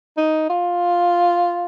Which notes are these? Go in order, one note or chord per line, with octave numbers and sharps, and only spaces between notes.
D#4
F4